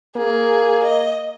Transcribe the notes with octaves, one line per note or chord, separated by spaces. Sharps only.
A#3 G#4
D#5